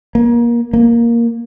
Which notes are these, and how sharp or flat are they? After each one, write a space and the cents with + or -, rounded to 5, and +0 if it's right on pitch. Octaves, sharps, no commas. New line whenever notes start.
A#3 +25
A#3 +5